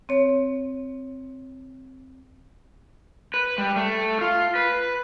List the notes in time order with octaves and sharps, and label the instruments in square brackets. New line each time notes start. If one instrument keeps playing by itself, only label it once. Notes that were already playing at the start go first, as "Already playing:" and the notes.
[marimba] C4 C#5
[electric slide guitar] B4
G3
A3
F4
B4